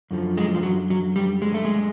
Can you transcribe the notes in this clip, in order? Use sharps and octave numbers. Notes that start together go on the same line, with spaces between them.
F#2 D3 F3
G#3
F3
F#3
F#3
G3
G#3
A3
G#3